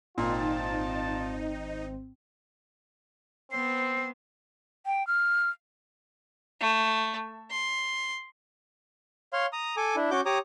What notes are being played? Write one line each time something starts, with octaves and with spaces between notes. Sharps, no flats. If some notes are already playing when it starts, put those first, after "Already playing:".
G#1 A#2 C4 D#4 F4 D5 A5
B3 C4 C5 C7
G5
F6
A3
C6
C#5 F5 C6
A#5 D#6
A4 G#5 D6
D4 E4
C#4 F#4 D6 G6
G4 C#5 A#5 D6 D#6